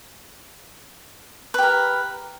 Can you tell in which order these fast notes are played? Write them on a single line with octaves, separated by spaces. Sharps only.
B4 G4 A#4